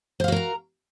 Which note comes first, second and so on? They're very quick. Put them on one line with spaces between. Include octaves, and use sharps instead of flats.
C5 F5 F#4 A#4 A#5